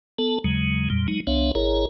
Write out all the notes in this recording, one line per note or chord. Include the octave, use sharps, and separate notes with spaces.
B3 A4 A5
D#2 C#3 F#3 G#3
F2 A#2 G3
F#3 G#3 D#4
C2 B3 D4 C#5 E5 F5
G#1 E4 G#4 A#4 C#5 A#5